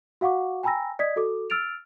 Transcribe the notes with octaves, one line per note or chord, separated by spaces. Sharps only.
F#4 F5 F#5 C#6 D6
G5 G#5 A#5 B5 E6 A#6
D5 D#5 D#6 G#6 B6
F#4 A4 D6
E6 F6 A6 D7 F7